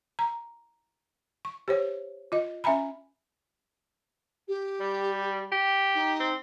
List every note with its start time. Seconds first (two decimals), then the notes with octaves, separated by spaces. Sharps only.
0.19 A#5
1.45 C#6
1.68 G4 C5 C#5
2.32 F4 D#5
2.64 C#4 E5 G#5 A#5 B5
4.48 G4
4.80 G3
5.52 G4
5.94 D#4
6.20 C4